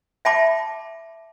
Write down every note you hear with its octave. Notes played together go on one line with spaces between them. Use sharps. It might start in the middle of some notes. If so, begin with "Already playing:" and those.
E5 G5 A5 B5 D6